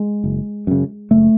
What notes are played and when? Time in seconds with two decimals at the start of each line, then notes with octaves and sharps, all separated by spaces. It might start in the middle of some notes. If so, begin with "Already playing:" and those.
Already playing: G#3
0.24 F#1
0.67 F#2 C#3
1.11 F#1 A3